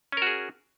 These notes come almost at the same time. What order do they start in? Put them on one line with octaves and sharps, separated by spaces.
C#4 A#4 F#4 G#4